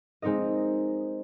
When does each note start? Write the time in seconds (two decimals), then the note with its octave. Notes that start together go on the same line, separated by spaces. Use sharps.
0.22 G#3 C4 D#4 A#4 D#5